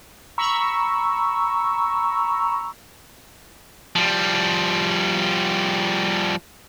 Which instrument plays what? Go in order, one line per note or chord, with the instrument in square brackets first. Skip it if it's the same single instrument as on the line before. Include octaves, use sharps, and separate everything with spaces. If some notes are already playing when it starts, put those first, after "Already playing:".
[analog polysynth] A#5 B5 C#6 E6
[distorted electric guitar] F3 G3